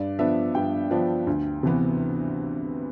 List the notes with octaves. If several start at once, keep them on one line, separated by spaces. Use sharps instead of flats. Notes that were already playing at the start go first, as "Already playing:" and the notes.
Already playing: G2 D5
F3 B3 D4 E5
G2 G5
F3 B3 D4
D2
C3 E3 B3